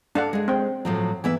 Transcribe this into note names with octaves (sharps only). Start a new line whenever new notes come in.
D4 A4 F5 F#5
G#3 G#4
C4 G5
A2 F3 F#3
E3 B3 E5